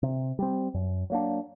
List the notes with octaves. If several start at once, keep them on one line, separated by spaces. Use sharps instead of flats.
C3
G3 C4
F#2
F#3 A#3 D4